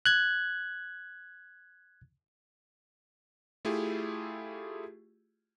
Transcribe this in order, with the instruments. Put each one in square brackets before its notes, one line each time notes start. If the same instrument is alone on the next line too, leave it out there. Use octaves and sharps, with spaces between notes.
[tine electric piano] F#6 G#6
[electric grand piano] A3 E4 F4 G4 G#4